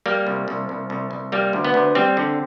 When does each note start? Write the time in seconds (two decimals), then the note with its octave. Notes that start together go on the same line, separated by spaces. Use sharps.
0.06 G3 A#3
0.27 C2
0.48 C2
0.69 C2
0.90 C2
1.11 C2
1.32 G3 A#3
1.53 D2
1.65 B3
1.74 D2
1.95 G3 C4
2.17 D3